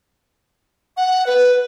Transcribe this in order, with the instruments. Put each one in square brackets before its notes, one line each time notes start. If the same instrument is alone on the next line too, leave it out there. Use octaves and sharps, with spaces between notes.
[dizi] F#5
B4